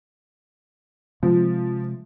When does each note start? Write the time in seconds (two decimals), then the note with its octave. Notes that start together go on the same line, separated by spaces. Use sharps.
1.23 C3 F3 G#3 C4